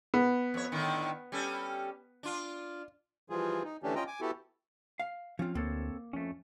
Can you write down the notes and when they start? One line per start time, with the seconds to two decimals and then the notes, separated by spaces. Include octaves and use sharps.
0.14 B3
0.54 F2 C#5
0.72 A2 D3 D#3
1.32 G3 C#4 A4
2.23 D4 F4
3.30 E3 F3 G3 F4 G#4
3.64 D#4
3.83 D3 E3 A3 C#4 D4 G4
3.95 C#4 F4 D#5 G5 A#5
4.07 G#5 D6
4.21 B3 E4 F#4 G4 A4
4.99 F5
5.39 F3 C4 C#4 F4
5.55 D2 A#3 C4 A4 C#5
6.13 F2 A3 C#4